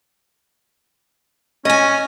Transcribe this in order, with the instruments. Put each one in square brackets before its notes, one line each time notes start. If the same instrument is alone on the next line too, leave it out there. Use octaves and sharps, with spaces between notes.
[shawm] C#4 [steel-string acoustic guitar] D#5 G#5